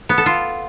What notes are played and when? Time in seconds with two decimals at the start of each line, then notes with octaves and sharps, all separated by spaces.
0.09 B3
0.18 A4
0.26 F4